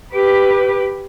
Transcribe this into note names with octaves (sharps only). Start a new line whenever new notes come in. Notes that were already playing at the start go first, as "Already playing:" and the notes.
G4 B4